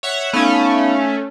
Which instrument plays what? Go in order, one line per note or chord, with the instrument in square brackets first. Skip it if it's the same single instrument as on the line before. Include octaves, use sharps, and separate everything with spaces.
[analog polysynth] C#5 E5 F#5
[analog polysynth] A3 C#4 [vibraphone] B3 D#4 F5